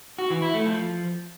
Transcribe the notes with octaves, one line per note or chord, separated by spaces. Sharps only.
F#4
E3
E4
A3
F3